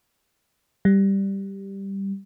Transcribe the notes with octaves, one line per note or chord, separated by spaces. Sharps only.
G3